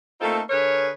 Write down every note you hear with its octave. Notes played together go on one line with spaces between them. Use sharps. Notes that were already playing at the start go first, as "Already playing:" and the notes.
A3 A#3 C4 D#4 F4 A4
D3 G#4 A#4 B4 C#5